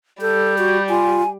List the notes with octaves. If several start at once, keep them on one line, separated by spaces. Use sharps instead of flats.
G3 A4 G6
F#4
F4 G#5